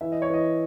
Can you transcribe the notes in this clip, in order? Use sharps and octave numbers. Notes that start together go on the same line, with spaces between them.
E3 E5
D#5
C#5
E3 D#5